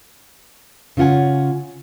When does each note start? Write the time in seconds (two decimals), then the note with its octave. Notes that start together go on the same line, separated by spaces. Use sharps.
0.97 C#3 C#4 F4 F#5 G#5